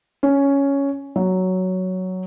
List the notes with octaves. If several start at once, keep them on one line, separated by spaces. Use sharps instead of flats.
C#4
F#3